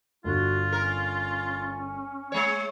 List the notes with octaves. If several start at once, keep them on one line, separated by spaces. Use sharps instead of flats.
G1 F4 F#4
C#4 A#4
G#3 C#5 G#5